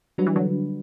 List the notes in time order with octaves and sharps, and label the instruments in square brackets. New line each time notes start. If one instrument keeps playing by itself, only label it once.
[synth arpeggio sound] F#3 [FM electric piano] G3 D4 F#4 B4
[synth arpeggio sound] E3
D3 F#3